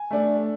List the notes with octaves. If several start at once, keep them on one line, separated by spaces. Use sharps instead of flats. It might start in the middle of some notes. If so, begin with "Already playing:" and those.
Already playing: G#5
A3 D4